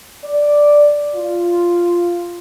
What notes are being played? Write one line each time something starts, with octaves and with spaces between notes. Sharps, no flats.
D5
F4